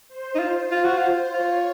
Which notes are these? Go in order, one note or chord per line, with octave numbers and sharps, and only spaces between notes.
C5
D#4
F4
F4
F#4
F4
F4 C#5